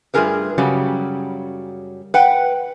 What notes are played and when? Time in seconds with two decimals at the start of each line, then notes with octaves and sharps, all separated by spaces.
0.14 G2 A3 F4 G#4 A#4 B4
0.58 F#2 C#3 F#3 G3
2.14 B4 F#5 G5